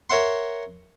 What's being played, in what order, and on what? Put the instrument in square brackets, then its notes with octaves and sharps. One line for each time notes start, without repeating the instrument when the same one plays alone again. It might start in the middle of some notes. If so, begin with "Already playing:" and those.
[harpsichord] A#4 C#5 E5 F#5 C6